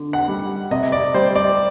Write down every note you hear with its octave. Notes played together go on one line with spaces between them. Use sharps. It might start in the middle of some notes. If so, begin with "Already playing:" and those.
Already playing: D3
F#5
G3
C3 D#5
D5
G3 C5
D5